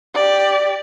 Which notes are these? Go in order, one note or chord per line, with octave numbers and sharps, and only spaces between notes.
G4 D5